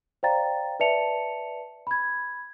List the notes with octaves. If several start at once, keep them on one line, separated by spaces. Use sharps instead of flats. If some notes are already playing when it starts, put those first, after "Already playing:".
C5 D5 F5 G5 A#5 A6
B4 D5 E5 A5 C#7 F7
B5 G#6